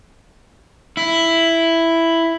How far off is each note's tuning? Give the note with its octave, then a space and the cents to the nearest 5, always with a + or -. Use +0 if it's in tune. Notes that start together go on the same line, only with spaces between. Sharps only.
E4 +5